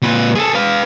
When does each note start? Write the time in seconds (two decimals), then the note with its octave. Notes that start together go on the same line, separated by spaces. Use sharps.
0.02 A#2 B4
0.35 G#4 A4
0.55 B4 F5